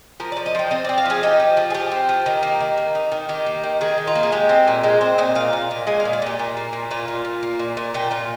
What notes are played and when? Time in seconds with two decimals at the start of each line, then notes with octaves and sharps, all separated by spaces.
0.20 F3 A#4
0.32 D5
0.37 F3
0.46 D#5
0.55 F3 G5
0.71 C4 D#5
0.85 D5
0.89 C4
0.98 F5
1.06 F3 G#4
1.23 D#4 G4
1.40 F3
1.57 F3
1.70 G#4
1.74 F3 G4
1.91 C4
2.09 F3
2.26 D#3
2.43 A#3
2.60 D#3
2.78 A#3
2.95 D#4
3.12 D#3
3.29 D#3 G4
3.46 A#3
3.64 D#3
3.81 D#3 G#4
3.98 D#4
4.07 F4
4.15 A#3
4.23 G#4
4.32 G#3 G4
4.49 C4
4.68 A#2
4.83 G#3 C5
5.01 C4 C5
5.18 A#2 D#5
5.35 A#2 F5
5.53 A#2
5.71 A#2
5.87 G#3 G#5
6.00 F5
6.05 A#2
6.13 D5
6.22 A#2 G4
6.39 A#2
6.57 A#3
6.73 A#2
6.91 A#2 F4
7.08 A#2
7.25 A#2
7.43 A#3
7.59 A#2
7.77 A#2
7.94 A#2 G4
8.11 A#2 F4